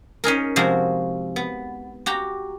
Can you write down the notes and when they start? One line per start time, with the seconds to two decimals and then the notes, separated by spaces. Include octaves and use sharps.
0.24 C#4 D#4 G#4 A#4
0.56 C3 F3 G#3 F#4
1.36 B3
2.06 F#4 G4 A#5